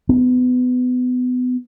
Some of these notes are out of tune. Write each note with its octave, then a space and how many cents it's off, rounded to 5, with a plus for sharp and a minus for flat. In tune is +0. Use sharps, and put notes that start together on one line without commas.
B3 +25